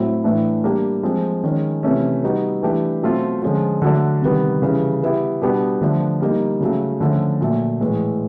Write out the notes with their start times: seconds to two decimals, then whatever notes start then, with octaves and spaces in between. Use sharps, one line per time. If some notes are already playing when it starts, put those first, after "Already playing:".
Already playing: A2 F#3 A3 C4 E4
0.24 A2 E3 A3 D4
0.64 G3 A#3 D4 G4
1.03 F3 G#3 C4
1.44 D#3 G#3 C#4
1.83 C3 E3 A3 C#4
2.23 G3 B3 D#4 F#4
2.63 E3 A3 D4 G4
3.03 B2 F#3 A3 C4 F4
3.42 D3 F3 G#3 C#4 F4
3.82 D3 F#3 A3 D4
4.22 C3 D#3 G3 B3
4.62 C#3 E3 G3
5.01 G3 B3 E4 G4
5.41 B2 G3 B3 D4 G4
5.81 D3 F3 A3 D4
6.21 G3 A#3 D#4
6.61 C#3 F#3 A3
7.00 D3 F3 A3 C#4
7.41 A#2 F#3 A3
7.80 A2 E3 G#3